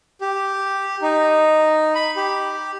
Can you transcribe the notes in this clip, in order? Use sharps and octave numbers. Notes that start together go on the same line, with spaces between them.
G4
D#4
B5
G4